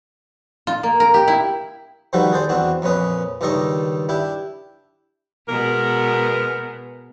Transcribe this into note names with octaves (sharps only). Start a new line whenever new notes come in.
F4
A#3
A#4
G4
E4
D#3 F3 G3 F#4 A4 B4
G#4 A4 C5 D5
E2 C4 D4 F#4
F2 A#2 C#4 B4 D#6
C#2 G2 D#3 A4 D#5 C#6
D4 E4 G4
B2 G#3 B3 A#4